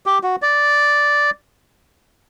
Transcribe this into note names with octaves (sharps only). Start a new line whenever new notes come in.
G4
F#4
D5